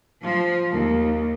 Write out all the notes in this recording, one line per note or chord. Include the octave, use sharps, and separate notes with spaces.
F3
D#2